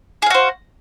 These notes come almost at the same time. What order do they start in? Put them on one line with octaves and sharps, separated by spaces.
G#4 F5 F#4 C5